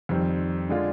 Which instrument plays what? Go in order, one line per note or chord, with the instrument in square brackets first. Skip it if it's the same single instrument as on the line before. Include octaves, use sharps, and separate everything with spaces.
[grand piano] F2 D#3 G3 C4
D3 G#3 D4 F4